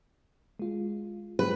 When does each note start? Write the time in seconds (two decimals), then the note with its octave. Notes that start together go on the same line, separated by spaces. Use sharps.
0.59 G#3 F4
1.39 G#3 G4 B4